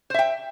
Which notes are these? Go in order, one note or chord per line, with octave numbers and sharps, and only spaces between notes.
C5 E5 G5